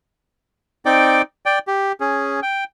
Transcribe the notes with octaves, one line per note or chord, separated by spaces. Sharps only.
C4 D#4 D5 G5 D6
D5 G5
G4
C#4 G#4
G5